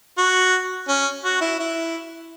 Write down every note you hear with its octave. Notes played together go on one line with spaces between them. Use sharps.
F#4
C#4
F#4
E4
E4